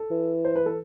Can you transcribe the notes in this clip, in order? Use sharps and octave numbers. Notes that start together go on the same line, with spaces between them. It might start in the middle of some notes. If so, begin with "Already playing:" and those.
Already playing: A4
E3
C5
B4
A4